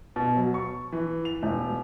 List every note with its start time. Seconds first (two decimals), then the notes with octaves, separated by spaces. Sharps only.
0.16 B2
0.37 F#3
0.54 C#6
0.92 E3
1.25 F7
1.43 E1